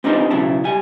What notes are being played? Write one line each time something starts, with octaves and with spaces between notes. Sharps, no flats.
C4 D4 D#4 G4 A#4 C5
B1 C#3 F#3 E4 A5
G3 G#5